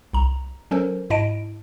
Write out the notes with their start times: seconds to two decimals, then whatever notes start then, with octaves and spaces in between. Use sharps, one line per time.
0.13 C2 A#5
0.71 F#3 C#4 A4 A#4 C5
1.10 G#2 E4 D#5 A5 D7